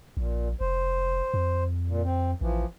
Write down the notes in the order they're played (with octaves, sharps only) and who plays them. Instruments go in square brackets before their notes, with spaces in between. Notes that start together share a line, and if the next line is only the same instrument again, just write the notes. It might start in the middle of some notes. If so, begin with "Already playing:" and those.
[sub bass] A#1 [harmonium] A#2
[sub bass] F1 [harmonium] C5
[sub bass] F2
[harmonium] A#2
C4
[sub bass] A1 [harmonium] E3 F3